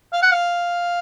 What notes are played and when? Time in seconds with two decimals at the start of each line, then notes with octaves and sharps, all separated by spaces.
0.13 F5
0.22 F#5
0.32 F5